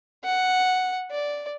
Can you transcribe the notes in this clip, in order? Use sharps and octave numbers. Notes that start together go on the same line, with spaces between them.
F#5
D5